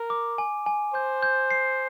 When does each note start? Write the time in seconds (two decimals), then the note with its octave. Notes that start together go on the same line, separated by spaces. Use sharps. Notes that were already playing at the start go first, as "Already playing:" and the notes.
Already playing: A#4
0.10 D6
0.38 G#5
0.66 G#5
0.94 C5 G6
1.23 G6
1.50 C7